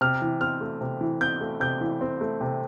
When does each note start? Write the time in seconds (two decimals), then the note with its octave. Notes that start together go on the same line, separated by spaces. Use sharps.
0.01 C3 F6
0.22 E3
0.41 C4 F6
0.61 A3
0.81 C3
1.01 E3
1.21 C4 G6
1.41 A3
1.60 C3 G6
1.81 E3
2.01 C4
2.21 A3
2.41 C3